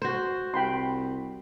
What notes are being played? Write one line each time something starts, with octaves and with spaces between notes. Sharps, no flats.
F#4 C5
C2 G5 B5 C6